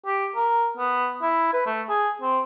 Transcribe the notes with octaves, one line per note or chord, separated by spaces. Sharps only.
G4
A#4
B3
E4
B4
A3
G#4
C4